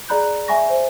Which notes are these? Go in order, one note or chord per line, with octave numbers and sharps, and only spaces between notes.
G#4 D5 A#5 B5 F#6 G6
E5 G#5 B5 C#6 A#6
C5